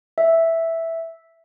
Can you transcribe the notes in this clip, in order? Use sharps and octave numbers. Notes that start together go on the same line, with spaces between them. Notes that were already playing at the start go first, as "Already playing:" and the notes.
E5